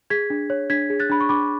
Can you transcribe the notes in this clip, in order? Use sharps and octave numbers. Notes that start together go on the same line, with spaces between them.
G#4 G#6 B6
D4
C#5
D4 G#6 B6
G#4
F#6 A6
D4 B5
C#6
D4 B5 D6